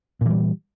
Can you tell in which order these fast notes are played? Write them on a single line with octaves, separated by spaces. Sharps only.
A#2 E3 G3